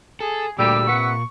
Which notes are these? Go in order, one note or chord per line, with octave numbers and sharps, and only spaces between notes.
G#4 A4
D2 A#2 G3 G4 D6 E6
C3 B4 F#5 C#6